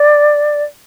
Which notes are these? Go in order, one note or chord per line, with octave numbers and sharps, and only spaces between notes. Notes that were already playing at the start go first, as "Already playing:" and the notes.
Already playing: D5